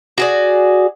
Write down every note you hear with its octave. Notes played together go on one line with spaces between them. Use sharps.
F#4 G#4 D5